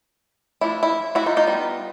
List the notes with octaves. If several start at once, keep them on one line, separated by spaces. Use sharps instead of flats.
F3 A3 D4 E4
E4
E4 F#4
D#4 F4
D#4 F4
G3 B3 D#4